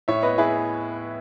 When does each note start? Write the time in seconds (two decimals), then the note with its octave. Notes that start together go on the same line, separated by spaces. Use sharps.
0.08 A2 C#5 E5
0.23 B3 B4 D#5
0.38 E4 G#4 B4